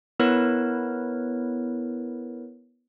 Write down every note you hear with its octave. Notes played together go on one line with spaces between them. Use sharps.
B3 E4 A#4 B4 C#5